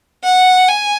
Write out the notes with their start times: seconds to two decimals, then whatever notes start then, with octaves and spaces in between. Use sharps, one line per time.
0.24 F#5
0.69 G#5